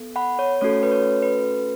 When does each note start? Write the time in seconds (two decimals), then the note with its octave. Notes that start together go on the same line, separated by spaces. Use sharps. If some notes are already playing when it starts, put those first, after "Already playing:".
Already playing: B3 A4
0.16 F#5 B5
0.39 C#5
0.61 A3 C#4 F#4 A4 C#5
0.83 B4
0.92 C#5
1.22 B4